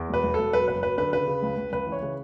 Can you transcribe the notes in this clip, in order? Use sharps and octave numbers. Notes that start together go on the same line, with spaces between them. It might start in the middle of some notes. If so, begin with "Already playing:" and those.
Already playing: E2
E1 B4
E1
E1 A4
F#3 B4
F#1 B4
F#3 B4
D3 B4
C#3 B4
C#3
C#2
C#2
C#2 B4
E3
C#5
C#3